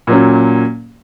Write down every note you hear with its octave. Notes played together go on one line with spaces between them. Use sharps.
A#2 F#3 C#4